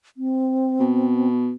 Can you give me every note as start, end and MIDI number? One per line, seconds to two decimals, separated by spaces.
0.17 1.28 60
0.80 1.53 47